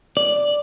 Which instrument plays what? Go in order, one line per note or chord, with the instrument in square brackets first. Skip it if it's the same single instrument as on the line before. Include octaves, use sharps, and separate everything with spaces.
[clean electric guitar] D5